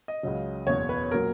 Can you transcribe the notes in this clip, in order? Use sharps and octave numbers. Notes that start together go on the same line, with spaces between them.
D#5
C#2 C#3 F#3
F#1 E2 B2 C#5
B4
A#2 F#3 A#4